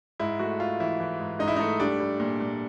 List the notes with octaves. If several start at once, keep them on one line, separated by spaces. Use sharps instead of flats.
G#2 E4
A3 F#4
A3 F4
E3 E4
E3
G#2
G#2 D#4
E4
A3 D#4
G3 D4
G3
A#2
A#2